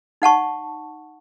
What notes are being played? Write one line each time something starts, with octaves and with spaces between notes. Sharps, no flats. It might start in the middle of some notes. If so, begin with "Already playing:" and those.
D#4 F#5 A5 C#6